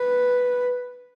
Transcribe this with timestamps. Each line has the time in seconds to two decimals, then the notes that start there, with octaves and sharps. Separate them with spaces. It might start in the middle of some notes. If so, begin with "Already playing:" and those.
Already playing: B4